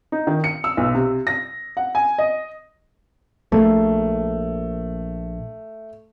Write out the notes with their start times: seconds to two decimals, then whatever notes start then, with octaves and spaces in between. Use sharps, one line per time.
0.12 D#4
0.27 D#3
0.44 C#7
0.64 E6
0.77 B1
0.95 C3
1.27 A#6
1.77 F#5
1.95 G#5
2.18 D#5
3.52 A#1 A3 A#3